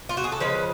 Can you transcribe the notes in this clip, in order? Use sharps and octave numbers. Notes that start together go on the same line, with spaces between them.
F4
F#4
G#4
A4
C#3 F3 G#3 B4